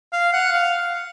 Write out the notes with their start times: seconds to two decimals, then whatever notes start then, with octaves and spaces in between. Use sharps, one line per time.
0.12 F5
0.33 F#5
0.53 F5